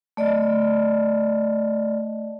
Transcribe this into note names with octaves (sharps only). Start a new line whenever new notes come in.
A3 D5 D#5